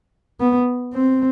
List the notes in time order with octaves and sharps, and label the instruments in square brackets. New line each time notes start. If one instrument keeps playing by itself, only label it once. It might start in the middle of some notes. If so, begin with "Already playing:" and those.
[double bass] B3
C4